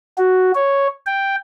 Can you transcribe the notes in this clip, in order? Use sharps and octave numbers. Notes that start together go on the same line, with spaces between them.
F#4
C#5
G5